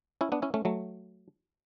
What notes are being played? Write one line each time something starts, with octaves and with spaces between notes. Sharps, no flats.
C#4 E4
B3 D4
C#4 E4
A3 C#4
F#3 A3